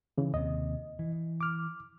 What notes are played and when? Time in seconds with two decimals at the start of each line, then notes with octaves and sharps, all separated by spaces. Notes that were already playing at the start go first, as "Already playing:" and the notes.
0.18 C#3 E3
0.34 D#2 C3 D#5
0.99 E3
1.41 D6 F6